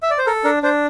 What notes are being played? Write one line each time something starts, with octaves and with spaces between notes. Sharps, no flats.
E5
D5
C5
A4 A#4
D4 A#4
D4 C5